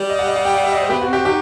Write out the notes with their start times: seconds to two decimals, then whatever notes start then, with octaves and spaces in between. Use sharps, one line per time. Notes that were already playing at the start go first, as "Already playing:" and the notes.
Already playing: G3
0.10 D#5
0.19 F#5
0.27 D#5
0.36 F#5
0.45 G5
0.54 F#5
0.63 E5
0.72 D#5
0.81 C5
0.90 B3 G4
1.02 F#4
1.08 C4
1.13 G4
1.25 D#4 G4